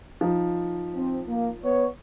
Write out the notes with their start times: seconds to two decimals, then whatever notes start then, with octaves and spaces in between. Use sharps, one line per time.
0.21 F3 D#4
0.96 C4
1.28 A#3
1.64 B3 C#5